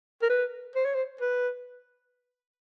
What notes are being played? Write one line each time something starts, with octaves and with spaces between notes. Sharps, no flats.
A#4
B4
C5
C#5
C5
B4